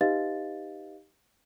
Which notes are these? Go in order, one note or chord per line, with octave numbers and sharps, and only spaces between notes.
D#4 G4 B4 D#5 F5 A6